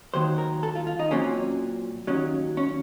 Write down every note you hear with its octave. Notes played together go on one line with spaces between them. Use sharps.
D#2 D#3 F#3 C5
A#4
A4
F4
F4
D#4
A#2 F#3 C4 C#4
D#2 D#3 F#3 C#4
C#4